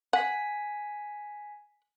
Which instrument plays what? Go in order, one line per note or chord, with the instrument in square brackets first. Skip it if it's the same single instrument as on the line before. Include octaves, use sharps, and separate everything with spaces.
[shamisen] F#5 [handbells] G#5 B6